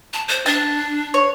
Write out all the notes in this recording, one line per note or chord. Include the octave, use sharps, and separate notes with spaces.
A5
C5
D4 A5
C#5